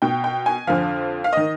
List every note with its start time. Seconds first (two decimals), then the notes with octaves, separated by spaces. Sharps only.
0.02 B2 G5
0.24 G5
0.46 G#5
0.67 F2 D3 F3 F5
1.24 F5
1.33 D#3 D#5